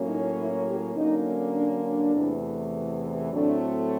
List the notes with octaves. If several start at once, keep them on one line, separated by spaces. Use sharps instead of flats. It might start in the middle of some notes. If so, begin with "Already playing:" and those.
Already playing: A2 F#3 A#3 C#4
D#4
E4
G4
D3 F#3 A#3 C#4 D#4
D4
D4
E2 C3 E3 A3
A2 F#3 A3 C4 D4